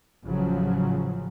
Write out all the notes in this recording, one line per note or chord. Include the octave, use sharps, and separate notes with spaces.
A1 C#3 F3 F#3